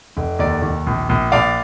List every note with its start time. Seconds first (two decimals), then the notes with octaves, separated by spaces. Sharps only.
0.17 F1
0.39 D#2 D5
0.62 D#2
0.86 A#1
1.09 A#1
1.32 A#1 D5 F5